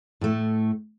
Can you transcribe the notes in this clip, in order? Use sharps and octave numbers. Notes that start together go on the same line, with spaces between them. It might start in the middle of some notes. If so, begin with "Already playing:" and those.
A2 A3